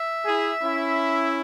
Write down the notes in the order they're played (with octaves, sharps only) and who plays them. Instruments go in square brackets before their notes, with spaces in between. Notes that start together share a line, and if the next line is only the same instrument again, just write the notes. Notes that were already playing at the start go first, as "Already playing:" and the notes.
Already playing: [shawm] E5
[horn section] E4 G#4
C#4 E4